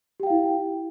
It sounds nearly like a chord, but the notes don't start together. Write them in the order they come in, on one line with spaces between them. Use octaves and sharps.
G4 G5 F5 E4